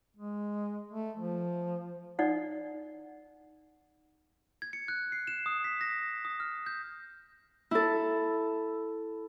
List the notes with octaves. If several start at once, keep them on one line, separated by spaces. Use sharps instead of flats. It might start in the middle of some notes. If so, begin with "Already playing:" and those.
G#3
A3
F3
D#4 D5 F#5
G#6
C#7
F#6
C7
E7
D#6
B6
A#6
D#6
F6
G6
E4 A4